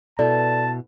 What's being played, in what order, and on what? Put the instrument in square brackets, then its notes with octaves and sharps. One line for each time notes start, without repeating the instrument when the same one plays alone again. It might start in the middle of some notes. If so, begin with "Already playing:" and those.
[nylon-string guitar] B2 E4 [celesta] A4 D5 [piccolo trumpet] A5